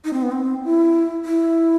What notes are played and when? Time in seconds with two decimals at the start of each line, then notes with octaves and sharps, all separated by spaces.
0.05 D#4
0.13 C4
0.22 B3
0.31 C4
0.64 E4
1.25 E4